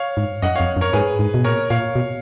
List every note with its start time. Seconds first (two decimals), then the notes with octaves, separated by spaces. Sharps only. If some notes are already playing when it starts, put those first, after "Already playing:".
Already playing: C#5 F5
0.17 G#2
0.42 F#2 D#5 F#5
0.55 F2 C#5 F5
0.77 F#2
0.81 A#4 C#5
0.93 G#2 G#4 B4
1.19 G#2
1.34 B2
1.44 A#2 A#4 C#5
1.70 A#2 C#5 F5
1.96 B2